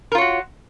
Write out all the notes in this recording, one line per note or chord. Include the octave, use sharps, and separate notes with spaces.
F4 F#4 A#4 C#5